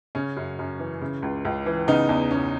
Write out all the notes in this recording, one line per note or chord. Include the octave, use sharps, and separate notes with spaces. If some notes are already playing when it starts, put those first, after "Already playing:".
C#3 C#4
F#2
F#2
E3
C#3
C#2
C#2
E3
C#3 B3 D#4
E2
E2 C#4